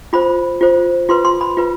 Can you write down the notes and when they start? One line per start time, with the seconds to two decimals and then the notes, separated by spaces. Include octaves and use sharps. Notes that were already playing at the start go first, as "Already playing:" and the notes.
0.13 F4 C5 B5
0.61 F4 C5
1.09 F4 B4 C6
1.25 C6
1.41 B5
1.57 F4 B4